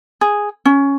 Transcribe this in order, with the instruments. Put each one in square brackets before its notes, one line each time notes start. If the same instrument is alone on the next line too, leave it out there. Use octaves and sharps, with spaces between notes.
[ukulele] G#4
C#4